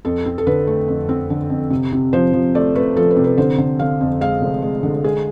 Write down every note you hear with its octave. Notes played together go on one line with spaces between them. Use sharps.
F2 A4
C4
A4
D3 B4
A3
F2
C4
D3
F2
C3
C3
F3 C5
F3
A3 D5
A3 B4
F3 A4
B4
C3
B4
D3 C5
D3
D3 F5
F2
G#3 F5
F1
G#3
D3
G#3 G#4